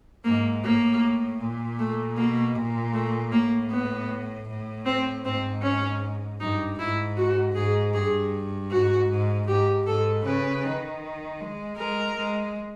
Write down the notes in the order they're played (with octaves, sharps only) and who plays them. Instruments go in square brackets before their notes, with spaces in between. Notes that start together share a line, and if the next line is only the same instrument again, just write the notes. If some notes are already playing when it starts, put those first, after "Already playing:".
[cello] G#2 [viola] A#3
[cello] A2 [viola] A#3
[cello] A#2
[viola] A3
[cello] B2 [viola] A#3
[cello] A#2
[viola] A3
[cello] A2 [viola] A#3
[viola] B3
[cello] A2
[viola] C4
[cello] G#2 [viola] C4
[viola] C#4
[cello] G2 [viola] D#4
[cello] G#2 [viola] E4
[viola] F#4
[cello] G#2 [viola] G#4
[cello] G2 [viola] G#4
[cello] G#2 [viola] F#4
[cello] G#2
[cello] G#2 [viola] G4
[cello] G#2 [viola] A4
[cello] C#3 [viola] B4
[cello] D#3
G#3
[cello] G#3 [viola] A#4
[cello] G#3